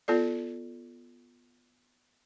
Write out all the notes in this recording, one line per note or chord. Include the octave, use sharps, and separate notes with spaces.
B3 F4 A4 D5